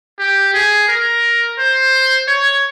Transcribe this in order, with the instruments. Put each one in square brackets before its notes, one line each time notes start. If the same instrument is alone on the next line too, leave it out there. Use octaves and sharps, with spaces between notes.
[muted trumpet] G4
G#4
A#4
C5
C#5